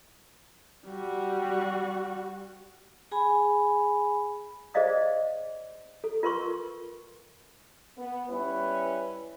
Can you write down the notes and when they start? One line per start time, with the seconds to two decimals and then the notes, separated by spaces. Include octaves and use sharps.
0.87 G3 F#4
3.12 G#4 G#5 B5
4.74 G#4 C5 D5 D#5 F5 D#6
6.04 A4
6.23 F4 A#4 B4 C6 C#6
7.98 B3
8.30 G3 C#4 E4 B4